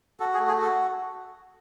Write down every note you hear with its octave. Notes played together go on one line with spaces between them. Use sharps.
F#4 A4
G#4
A3
G#4
F#4 A4